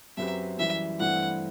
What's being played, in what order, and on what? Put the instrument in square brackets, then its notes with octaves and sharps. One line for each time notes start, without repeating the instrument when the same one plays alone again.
[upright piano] F#2 F#3 C4 G4 B4 [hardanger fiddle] E5
[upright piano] F#2 E3 G3 [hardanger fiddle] E5
[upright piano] G2 E3 A3 C4 E4 [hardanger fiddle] F#5